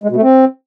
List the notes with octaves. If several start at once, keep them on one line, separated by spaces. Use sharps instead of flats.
G#3
B2
A3
C4